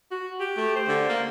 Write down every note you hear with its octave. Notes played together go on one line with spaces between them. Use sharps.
F#4
G4
A3
C5
D3
A#3